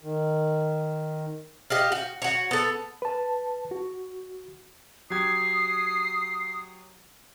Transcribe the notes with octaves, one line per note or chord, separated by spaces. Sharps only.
D#3
G4 D#5 F5
F#4
F#4 C#5
B3 A4
B4 A5
F#4
F#3 G4 D#6 G#6 C7